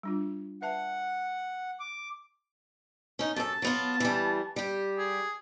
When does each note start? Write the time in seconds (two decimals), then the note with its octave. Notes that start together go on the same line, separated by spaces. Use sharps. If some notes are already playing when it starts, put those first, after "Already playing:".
0.03 G3 D4 F4
0.62 B4 E5 F#5 A5
1.80 D6
3.19 C#4 D#4
3.36 F#2 A4 A5
3.62 F#3 B3 F4
4.00 E3 G3
4.56 G3 G4
4.98 G#4